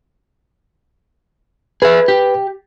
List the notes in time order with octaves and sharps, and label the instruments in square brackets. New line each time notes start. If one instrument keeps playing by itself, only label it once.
[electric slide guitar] G#4 E5 [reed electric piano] B4
[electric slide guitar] G4